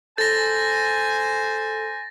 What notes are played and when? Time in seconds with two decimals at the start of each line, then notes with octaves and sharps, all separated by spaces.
0.18 A4 C5 G#5 A6 A#6